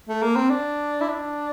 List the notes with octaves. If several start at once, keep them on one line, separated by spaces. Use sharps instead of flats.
A3
A#3
C4
D4
E4
D4